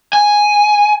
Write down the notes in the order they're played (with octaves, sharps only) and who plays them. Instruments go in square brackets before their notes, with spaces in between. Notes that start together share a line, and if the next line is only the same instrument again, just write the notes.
[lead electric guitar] G#5